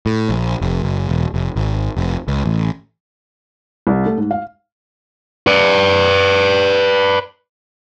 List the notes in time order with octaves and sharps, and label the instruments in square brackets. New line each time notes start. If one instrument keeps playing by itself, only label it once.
[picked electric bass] A2
A#1
F1
F#1
E1
F1
G#1
F1
C#2
A1
[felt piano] C2
A3
G#2
F5
[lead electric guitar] B4 D5